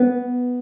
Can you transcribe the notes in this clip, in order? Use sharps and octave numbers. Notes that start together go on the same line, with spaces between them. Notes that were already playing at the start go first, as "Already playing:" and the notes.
Already playing: B3